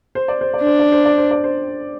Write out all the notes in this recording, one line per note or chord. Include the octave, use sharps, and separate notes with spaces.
C5
D5
C5
D5
D4
C5
D5
C5
D5
C5
D5
C5